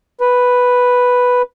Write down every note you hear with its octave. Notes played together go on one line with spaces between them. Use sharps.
B4